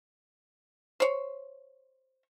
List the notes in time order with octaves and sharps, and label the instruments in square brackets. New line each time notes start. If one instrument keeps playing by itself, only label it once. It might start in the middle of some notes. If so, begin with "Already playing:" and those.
[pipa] C5 C#5